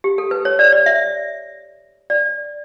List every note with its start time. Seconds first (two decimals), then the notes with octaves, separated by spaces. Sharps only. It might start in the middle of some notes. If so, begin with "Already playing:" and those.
0.04 G4
0.18 A4
0.31 B4
0.45 C#5
0.59 D5
0.72 D5
0.86 E5
2.10 D5